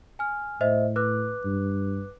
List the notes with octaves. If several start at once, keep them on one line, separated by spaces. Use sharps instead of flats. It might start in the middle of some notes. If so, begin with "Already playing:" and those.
G#5 F6
A2 C5 D#5 E5
B4 D6 F#6
G2